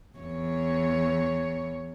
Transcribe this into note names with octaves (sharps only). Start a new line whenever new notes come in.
E2 C#5